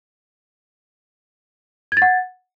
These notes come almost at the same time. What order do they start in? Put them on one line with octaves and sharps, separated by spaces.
G#6 A6 F#5